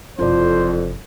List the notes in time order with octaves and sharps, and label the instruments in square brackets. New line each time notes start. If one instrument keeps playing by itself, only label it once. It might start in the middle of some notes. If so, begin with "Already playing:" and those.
[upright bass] F#1 C3 [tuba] F2 [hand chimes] F4 A4 D5 [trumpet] C5